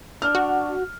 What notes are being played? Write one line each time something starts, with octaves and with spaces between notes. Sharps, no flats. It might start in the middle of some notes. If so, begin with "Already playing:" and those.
D4 F6
F#4